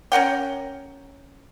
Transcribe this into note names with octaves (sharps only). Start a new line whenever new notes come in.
C#4 A#4 F#5 G5